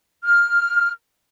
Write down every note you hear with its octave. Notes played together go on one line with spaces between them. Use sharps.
F6